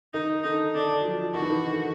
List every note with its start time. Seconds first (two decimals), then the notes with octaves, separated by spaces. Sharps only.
0.13 D#3 D#4
0.44 D3 D#4
0.74 D3 D4
1.00 F#3
1.05 F3
1.34 D#3 F#4
1.42 E3
1.50 D#3
1.65 D3